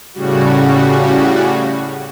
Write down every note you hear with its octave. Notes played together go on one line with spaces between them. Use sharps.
A2 C#3 G3 F#4